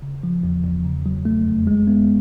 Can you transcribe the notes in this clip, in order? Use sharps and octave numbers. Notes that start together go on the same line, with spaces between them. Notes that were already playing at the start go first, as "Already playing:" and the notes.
C#3
F3
E2
E2
C#3
F#3
A3
F2
G#3
B3